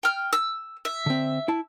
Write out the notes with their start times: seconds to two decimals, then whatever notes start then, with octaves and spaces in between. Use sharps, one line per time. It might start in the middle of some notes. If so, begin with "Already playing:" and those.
0.03 G5 F6
0.33 E6
0.85 E5
1.06 D3 C4
1.48 E4 A5